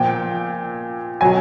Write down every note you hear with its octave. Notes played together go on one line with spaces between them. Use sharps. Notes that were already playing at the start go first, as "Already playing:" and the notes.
Already playing: A#2 F3 G5
B2 F#3 G#5